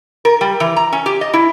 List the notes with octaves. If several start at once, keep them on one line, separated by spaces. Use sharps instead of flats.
A#4
G3
E3
A#5
C#4
G4
D#5
E4